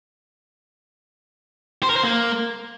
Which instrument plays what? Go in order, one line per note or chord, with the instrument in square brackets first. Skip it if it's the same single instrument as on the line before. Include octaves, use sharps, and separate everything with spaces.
[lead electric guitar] C5
A#4
C5
A#3